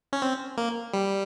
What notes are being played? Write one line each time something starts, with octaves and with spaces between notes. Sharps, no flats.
C#4
C4
A#3
G3